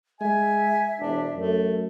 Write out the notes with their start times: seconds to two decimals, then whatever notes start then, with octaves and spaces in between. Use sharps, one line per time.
0.21 G#3 E5 G#5
1.00 E1 D4
1.35 F#2 A3